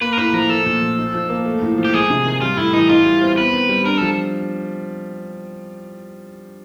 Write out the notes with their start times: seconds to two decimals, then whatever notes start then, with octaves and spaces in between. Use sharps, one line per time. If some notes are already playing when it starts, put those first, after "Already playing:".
0.01 A#3 B4
0.13 A#4
0.17 A2 B4
0.33 F3 A#4
0.49 A3 A4
0.66 A#2
0.81 F3
0.98 D#4
1.14 F3
1.29 A#3
1.45 A3
1.62 A2
1.78 F3
1.85 G4
1.94 G#3 G#4
2.10 C3
2.25 D#3
2.42 G3 F4
2.57 A2 E4
2.73 E3 D#4
2.89 E4 F4
3.05 G3
3.21 C4
3.38 B3 B4
3.54 D#3
3.69 G3
3.85 D4 A#4
3.97 F3 A4